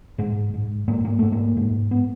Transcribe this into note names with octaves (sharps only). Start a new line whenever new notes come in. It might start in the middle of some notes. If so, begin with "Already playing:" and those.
G#2 G#3
G#2
G#2 A#3
A#3
G#2 A3
A#3
G#2
B3